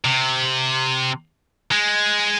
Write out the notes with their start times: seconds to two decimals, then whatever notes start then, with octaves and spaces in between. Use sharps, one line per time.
0.05 C3
1.72 G#3